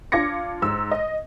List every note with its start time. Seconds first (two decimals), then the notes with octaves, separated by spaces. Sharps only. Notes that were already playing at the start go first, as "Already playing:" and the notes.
0.12 D4 F4 D6 G#6 A#6 C#7
0.62 G#2 E6
0.91 D#5